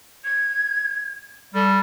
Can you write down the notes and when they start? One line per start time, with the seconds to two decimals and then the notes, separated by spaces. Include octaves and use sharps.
0.24 G#6
1.55 G3 A4